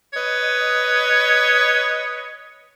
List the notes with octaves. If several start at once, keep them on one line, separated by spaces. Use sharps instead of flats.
B4 C#5 D#5